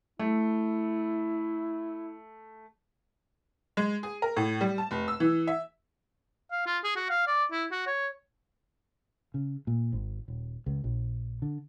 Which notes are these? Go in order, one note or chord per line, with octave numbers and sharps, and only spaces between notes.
A3 E4
G#3
G#4
A#4
A2
G3
A5
F1
E6
E3
E5
F5
F4
G#4
F#4
F5
D5
E4
F#4
C#5
C#3
A#2
G#1
D#1
C#2
A#1
D3